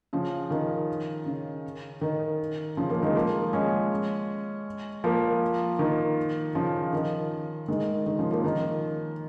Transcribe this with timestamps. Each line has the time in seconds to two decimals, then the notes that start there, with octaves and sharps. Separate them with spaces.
0.13 C#3 F3
0.50 D#3
1.26 C#3
2.01 D#3
2.77 C#3 F3
2.89 F3 A#3
3.02 D#3 G#3
3.15 F3 A#3
3.53 G#3 C#4
5.04 F3 A#3
5.79 D#3
6.55 C#3 F3
6.93 D#3
7.68 D#3 G#3
8.06 D#3
8.19 C#3 F3
8.31 F3 A#3
8.44 D#3